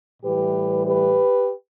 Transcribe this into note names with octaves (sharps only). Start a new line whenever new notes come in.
A2 E3 G3 G4 B4
G4 B4